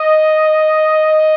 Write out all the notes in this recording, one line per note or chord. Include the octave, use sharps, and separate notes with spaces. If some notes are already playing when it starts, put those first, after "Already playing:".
Already playing: D#5